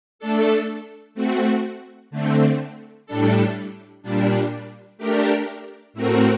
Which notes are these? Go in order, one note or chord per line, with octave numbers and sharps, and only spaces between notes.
A3 D4 A4
A3 C4 F#4
D3 A3 C4
A2 G3 D4 A4
A#2 G3 D4
A3 D4 G4 A#4
A2 A3 C4 F#4 A#4